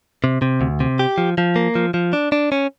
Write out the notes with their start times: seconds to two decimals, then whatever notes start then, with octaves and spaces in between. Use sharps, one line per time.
0.24 C3
0.42 C3
0.61 D2
0.80 C3
0.99 G4
1.18 F3
1.38 F3
1.56 A#3
1.75 F3
1.94 F3
2.13 D4
2.32 D4
2.52 C#4